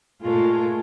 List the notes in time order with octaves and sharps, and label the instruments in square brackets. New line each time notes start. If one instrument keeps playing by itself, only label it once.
[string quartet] A#2 G#3 A3 [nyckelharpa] F4 A#4